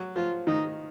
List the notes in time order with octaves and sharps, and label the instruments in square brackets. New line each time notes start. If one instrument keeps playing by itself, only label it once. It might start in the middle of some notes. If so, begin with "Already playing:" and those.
Already playing: [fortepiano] F#3
[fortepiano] F3 [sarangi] F4
[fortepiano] D#3 [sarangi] D#4